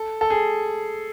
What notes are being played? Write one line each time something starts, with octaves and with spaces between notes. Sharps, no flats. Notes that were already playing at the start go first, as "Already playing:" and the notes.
Already playing: A4
A4
G#4